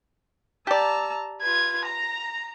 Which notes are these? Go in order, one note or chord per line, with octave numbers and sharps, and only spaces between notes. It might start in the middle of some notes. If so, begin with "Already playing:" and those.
G4 D5 A5 A#5 E6
F4 B4 G#6
A#5 A#6